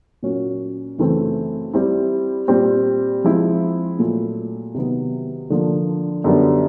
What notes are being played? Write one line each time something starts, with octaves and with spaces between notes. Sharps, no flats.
A#2 F#3 A#3 C#4 F#4
F#2 C#3 E3 A3 C4
G3 C4 E4
A#2 G3 C4
F3 G#3 C4 E4
A#2 F#3 A3
C3 D#3 F#3 B3
D3 F3 A#3
F#2 D3 G3 B3 D4